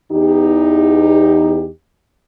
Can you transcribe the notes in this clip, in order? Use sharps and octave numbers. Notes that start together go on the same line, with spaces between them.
E2 D#4 G4